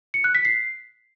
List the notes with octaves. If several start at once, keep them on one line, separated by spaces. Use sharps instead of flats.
C#7
F#6
B6
C7